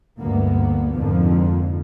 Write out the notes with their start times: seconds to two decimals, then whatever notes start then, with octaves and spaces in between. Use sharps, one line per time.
0.20 D2 G2 A#3 B3
0.94 F2 G#2 D3 F3 A#3